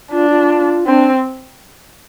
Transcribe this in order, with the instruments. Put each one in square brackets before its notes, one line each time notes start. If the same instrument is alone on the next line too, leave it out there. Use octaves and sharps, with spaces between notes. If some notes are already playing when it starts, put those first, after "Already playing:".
[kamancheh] D4 [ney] F4
[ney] F4
[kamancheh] C4 [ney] D4